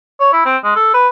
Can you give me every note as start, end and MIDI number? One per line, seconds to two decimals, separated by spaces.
0.20 0.30 73
0.33 0.43 64
0.46 0.57 60
0.64 0.74 56
0.76 0.91 69
0.94 1.08 71